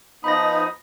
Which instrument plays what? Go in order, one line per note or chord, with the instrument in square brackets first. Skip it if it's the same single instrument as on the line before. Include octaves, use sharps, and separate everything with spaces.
[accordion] F3 B3 D#4 [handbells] B5 A#6 [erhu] D#6